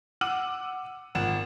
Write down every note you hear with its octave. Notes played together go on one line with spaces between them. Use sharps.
F#5 D6 E6 D#7 F#7
G#1 A#2 F#5 E7